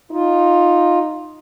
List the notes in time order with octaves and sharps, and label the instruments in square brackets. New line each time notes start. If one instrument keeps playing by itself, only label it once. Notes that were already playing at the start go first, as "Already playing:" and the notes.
[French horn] D#4 [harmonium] F4